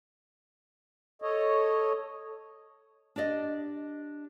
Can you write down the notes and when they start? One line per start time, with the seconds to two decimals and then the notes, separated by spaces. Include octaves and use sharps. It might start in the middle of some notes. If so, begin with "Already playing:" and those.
1.22 A4 C#5 D#5
3.16 D4 G4 D5 D#5